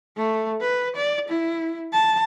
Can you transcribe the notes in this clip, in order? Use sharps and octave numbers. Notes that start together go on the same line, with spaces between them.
A3
B4
D5
E4
A5